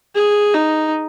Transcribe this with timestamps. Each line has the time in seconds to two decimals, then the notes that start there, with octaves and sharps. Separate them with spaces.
0.15 G#4
0.54 D#4